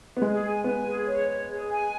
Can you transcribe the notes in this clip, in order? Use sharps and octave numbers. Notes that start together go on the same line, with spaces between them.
B3
G#3 G#4
G#5
B3 G#5
G#4
C#5
C#5
G#4
G#5